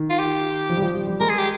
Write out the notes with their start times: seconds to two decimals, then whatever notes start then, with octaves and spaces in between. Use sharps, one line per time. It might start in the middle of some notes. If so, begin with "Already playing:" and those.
Already playing: D#3
0.10 F4
0.19 G4
0.69 F3
0.77 G3
0.82 F3
0.95 G3
1.07 G3
1.20 G#3 A#4
1.30 G#4
1.38 G4